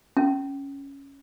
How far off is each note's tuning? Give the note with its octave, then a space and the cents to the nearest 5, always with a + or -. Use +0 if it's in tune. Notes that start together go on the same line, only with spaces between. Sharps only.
C#4 +0